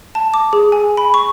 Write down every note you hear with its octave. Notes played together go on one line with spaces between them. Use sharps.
A5
D6
G#4
G#5
B5
C#6